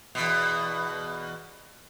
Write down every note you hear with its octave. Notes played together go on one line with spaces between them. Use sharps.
E2 B2